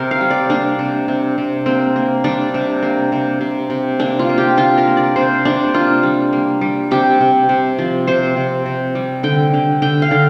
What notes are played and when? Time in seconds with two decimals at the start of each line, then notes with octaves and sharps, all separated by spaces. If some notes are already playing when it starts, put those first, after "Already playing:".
Already playing: C3 A#4
0.11 F5
0.21 G3
0.30 D5
0.50 A#3 D4
0.79 C3
1.08 C3
1.38 C3
1.66 A#3 C4
1.96 A#3
2.24 G3 D4
2.54 C3
2.83 A#3
3.12 C3
3.41 C3
3.70 C3
4.00 A#3 D4
4.19 F4
4.29 A#3
4.38 G4
4.57 C3 F4
4.78 A#4
4.88 A#3
4.97 D5
5.16 C3 C5
5.45 C3 D4
5.74 A#3 F4
6.03 G3
6.33 A#3
6.61 G3
6.91 C3 G4
7.21 C3
7.49 C3
7.78 F3
8.07 C3 C5
8.37 C3
8.66 C3
8.95 G3
9.23 D3 G5
9.54 D3
9.82 D3 G5
10.02 F5
10.11 D3